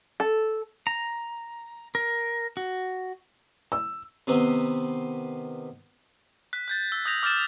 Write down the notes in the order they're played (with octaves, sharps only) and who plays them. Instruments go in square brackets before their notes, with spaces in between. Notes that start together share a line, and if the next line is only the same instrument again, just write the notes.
[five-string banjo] A4
[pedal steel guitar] A#5
A#4
F#4
[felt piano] E6
[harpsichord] C3 D#3 B3 C4
[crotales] F#6 B6
F#6 G6 A6
E6
D#6 G6 A#6 F7
D6 F6 G6 A6 E7